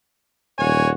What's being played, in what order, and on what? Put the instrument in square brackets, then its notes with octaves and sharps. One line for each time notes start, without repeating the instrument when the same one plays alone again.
[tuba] D#1 [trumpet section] F#4 C#5 G#5